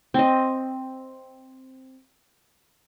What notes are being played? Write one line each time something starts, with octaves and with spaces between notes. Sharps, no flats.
C4 D#5